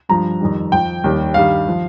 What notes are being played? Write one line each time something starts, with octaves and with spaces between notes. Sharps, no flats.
G2 F3 A#5
F2 D#3 G3
F2 F3 G5
D#2 D#3 G3
G2 D#3 G3 F5
F3